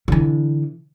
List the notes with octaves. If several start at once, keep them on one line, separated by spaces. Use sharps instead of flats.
D3 E3